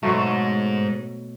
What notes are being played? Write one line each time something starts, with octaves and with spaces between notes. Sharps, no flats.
G#2 B2 F#3 A3